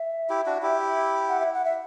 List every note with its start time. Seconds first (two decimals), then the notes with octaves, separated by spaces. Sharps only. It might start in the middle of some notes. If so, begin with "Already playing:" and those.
Already playing: E5
0.29 E4 G4
0.46 D4 F#4
0.62 E4 G4
1.29 F#5
1.40 E5
1.54 F#5
1.65 E5